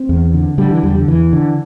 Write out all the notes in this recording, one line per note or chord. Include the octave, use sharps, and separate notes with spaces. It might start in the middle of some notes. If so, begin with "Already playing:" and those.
Already playing: C4
E2
D3
D3 G3
E3
E2 G3
D3
E2 E3
D3